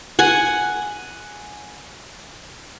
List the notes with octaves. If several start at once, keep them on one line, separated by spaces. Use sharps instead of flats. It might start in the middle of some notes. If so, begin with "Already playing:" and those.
F#5 G#5